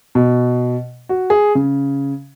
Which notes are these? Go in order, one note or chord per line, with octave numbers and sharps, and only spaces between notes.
B2
F#4
G#4
C#3